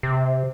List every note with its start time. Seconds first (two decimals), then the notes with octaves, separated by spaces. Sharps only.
0.03 C3